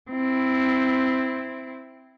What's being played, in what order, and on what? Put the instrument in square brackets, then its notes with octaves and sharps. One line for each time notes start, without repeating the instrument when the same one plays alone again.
[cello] C4 E4